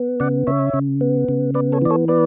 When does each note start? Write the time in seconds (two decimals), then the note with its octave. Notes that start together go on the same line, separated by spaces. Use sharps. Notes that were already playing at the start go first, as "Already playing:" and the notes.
Already playing: B3
0.20 C#3 D5 F#5
0.47 C#3 C#5 E5
0.74 C#3
1.01 B3
1.28 C#3
1.54 B3 B4 D5
1.72 A4 C#5
1.81 E3 D5
1.90 A4 C#5
2.08 B3 B4 D5